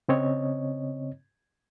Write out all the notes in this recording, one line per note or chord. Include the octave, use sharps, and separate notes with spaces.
C#3 C4 C#5 D#5